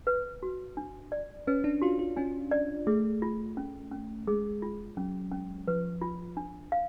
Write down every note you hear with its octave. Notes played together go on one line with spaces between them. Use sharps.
B4
F#4
D4
D5
C#4 B4
D4
F4 F#4
F4
C#4 D4
D5
A3 G#4
F4
C#4
C#4
G#3 G#4
F4
F#3 C#4
C#4
F3 B4
F4
D4
F5